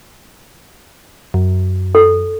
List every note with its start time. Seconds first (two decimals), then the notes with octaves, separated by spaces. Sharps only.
1.34 F#2
1.95 A4